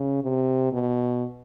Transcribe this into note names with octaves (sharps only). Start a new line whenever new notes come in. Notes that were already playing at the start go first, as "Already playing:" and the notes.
Already playing: C#3
C3
B2